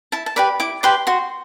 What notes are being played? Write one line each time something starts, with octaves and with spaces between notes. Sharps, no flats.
E4 A5
A5
G4 B4 D5 B5
E4 D6
G4 B4 D5 C6
F#4 C6